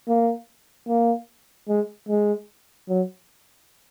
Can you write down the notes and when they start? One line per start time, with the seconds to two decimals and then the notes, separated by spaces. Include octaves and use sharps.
0.08 A#3
0.88 A#3
1.68 G#3
2.09 G#3
2.89 F#3